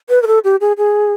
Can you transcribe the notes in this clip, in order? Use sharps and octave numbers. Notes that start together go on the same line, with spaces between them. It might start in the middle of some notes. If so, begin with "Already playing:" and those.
B4
A#4
A4
G4
G#4
G#4